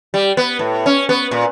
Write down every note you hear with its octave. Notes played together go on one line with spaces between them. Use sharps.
G3
B3
A2
C#4
B3
A#2